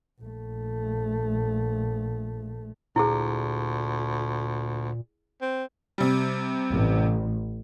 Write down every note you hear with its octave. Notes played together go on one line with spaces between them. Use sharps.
A#1 A3
D2 A#2 E4 G#4
C4
C3 G3
A1